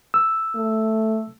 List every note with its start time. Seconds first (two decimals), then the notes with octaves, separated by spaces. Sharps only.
0.14 E6
0.55 A3